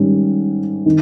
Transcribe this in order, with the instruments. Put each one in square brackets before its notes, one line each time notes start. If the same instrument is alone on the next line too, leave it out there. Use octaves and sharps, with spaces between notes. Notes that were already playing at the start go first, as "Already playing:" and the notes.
Already playing: [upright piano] G#2 D#3 G3 C#4
D#3